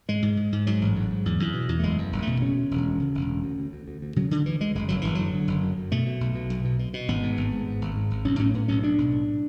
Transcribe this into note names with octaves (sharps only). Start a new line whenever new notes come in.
G#2 G#3
G#2
G#2
G#2
G#2 F#3
A1
G#2
G#2
E2
E2
B2
E2
A3
F#1 G#3
E2
F#1
B2 A3
C#3 C#4
D2
E1
D2
C#3
E1
D2
D2
D2
D2
D2
D2
C#3 F#3
D2 D3
D2 E3
D2 G#3
F#1 G#3
F#1 F#3
F#1 E3
D3 F#3
D3
F#1
F#2
F#2
B2 A3
B2
B1
B2
B1
B2
B2
B2
G#1 B3
G#2
G#1
G#2
G#2
G#1
G#2
G#1
B1 C#4
A2 C#4
A2 B3
B1 C#4
A2 D4
B1
A2